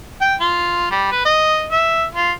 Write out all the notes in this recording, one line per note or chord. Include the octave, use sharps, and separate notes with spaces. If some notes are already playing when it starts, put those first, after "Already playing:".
G5
F4
G3
B4
D#5
E5
F4